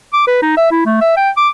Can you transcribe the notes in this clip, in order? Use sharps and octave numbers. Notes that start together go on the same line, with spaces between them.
D6
B4
D#4
E5
E4
A3
E5
G5
D6